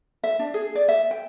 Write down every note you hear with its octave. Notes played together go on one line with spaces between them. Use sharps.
E5
D4
G#4
D5
E5
G5